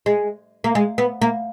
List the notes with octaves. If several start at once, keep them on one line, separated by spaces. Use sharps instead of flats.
G#3
A#3
G#3
B3
A#3